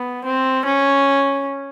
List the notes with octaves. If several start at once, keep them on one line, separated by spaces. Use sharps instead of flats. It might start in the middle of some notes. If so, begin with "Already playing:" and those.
Already playing: B3
C4
C#4